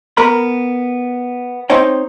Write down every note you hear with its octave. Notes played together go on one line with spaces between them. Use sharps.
B3 A#4 A#5 B5
C4 D#4 C5 C#5 G5